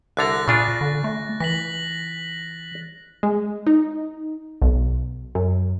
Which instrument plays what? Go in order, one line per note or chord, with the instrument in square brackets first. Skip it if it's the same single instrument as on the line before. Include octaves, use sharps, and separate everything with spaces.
[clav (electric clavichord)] C2 D3 A#5 [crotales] F#6 A6 A#6
[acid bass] A#2 [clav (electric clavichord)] C#3 D4 F4
[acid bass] D3
A3
[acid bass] E3 [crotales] A#6 B6 F#7
[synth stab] G#3
D#4
B1
F#2